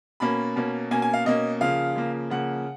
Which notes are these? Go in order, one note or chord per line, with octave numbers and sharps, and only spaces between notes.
B2 A#3 C#4 B5
B2 A#3 C#4
B2 A#3 C#4 G#5
G#5
F5
B2 A#3 C#4 D#5
C#3 F3 A#3 F5
C#3 F3 A#3
C#3 F3 A#3 F#5